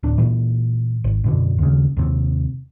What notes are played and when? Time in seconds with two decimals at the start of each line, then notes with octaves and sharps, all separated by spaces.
0.03 D1 D4
0.18 A#2 E3
1.04 G#1
1.24 F#2 B2 D3
1.59 D#2 C#3
1.97 D#2 C3